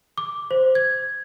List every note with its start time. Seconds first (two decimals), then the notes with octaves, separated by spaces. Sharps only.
0.18 D6
0.51 C5
0.75 G#6